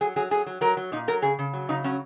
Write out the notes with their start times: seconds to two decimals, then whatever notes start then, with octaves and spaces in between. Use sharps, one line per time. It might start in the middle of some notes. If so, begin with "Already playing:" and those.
0.01 F#3 G#4
0.16 F#3 G#4
0.31 F#3 G#4
0.46 F#3
0.61 F#3 A#4
0.77 F#3
0.92 A#2 D#4
1.08 F#3 A#4
1.22 C#3 G#4
1.39 C#3
1.53 F#3
1.69 C#3 D#4
1.84 F#3 C#4